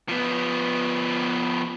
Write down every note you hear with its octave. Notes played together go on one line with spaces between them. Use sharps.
F3 B3